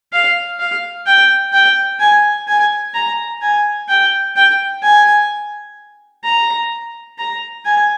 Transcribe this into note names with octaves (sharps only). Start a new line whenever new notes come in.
F5
F5
G5
G5
G#5
G#5
A#5
G#5
G5
G5
G#5
A#5
A#5
G#5